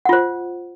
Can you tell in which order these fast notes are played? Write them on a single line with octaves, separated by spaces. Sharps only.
F#5 F4 C5